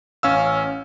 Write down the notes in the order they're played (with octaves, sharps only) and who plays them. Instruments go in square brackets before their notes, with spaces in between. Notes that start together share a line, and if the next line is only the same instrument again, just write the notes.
[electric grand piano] A1 C#4 F5 E6